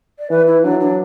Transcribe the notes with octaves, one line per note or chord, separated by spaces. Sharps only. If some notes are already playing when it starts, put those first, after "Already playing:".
D5
E3 B4
E4
F#3 D4
D4